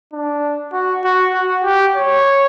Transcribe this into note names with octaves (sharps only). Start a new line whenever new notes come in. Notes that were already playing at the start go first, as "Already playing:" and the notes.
D4
F#4
F#4
F#4
G4
C#5